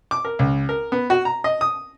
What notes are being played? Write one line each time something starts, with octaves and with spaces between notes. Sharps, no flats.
D6
A#4
C#2
A#4
B3
F#4
A#5
D#5
D#6